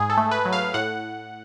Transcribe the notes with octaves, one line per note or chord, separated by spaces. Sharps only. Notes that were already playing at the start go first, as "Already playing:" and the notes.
Already playing: G#2 G#4
A4
A3
B4
F#3
F5
A2 F#5